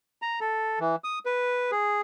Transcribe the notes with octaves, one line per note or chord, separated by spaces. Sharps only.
A#5
A4
E3
D#6
B4
G#4